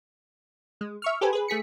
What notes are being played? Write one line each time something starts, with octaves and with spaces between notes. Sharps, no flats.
G#3
E5 C#6 F6
G4 A4 B4 C5 G#5
G#4 B4
A3 G#4 B6 C#7